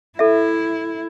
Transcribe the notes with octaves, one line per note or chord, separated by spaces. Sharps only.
E4 A4 E5